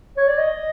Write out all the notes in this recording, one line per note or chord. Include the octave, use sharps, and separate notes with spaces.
C#5
D5
D#5